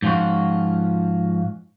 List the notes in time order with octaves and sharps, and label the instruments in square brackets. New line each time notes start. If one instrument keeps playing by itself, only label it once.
[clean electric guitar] G#2 F3 C#4 F4 F#4